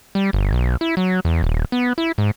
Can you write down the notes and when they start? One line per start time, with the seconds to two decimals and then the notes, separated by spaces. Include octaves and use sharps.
0.15 G3
0.33 G1
0.52 B1
0.81 E4
0.97 F#3
1.25 E2
1.43 D#1
1.72 B3
1.98 E4
2.18 G#2